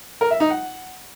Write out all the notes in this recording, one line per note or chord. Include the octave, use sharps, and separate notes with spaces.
A#4
E5
D#4
F#5